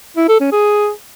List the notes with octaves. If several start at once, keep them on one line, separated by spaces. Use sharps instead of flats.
E4
A4
C#4
G#4